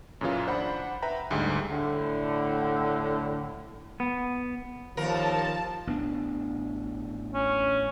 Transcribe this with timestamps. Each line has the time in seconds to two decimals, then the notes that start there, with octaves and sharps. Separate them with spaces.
0.21 F#2 A#2 C#3 E3 F4
0.47 D4 C5 F#5 B5
1.02 B4 E5 G5 A#5
1.31 D2 G#2 G3 G#3
1.70 A2 D3
4.00 B3
4.97 D#2 F3 A#4 A5
5.87 A1 B3 D4
7.34 C#4